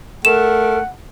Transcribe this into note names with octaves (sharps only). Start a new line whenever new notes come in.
A3 A#4 F#5 E7